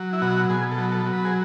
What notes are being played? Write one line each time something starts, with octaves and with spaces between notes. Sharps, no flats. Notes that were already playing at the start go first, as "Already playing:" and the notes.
Already playing: F#3
E4
B2 F#4
B2 G#4
A4
F#3
A4
F#3
B4
G#4